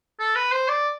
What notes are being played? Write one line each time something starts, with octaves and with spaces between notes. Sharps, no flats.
A4
B4
C5
D5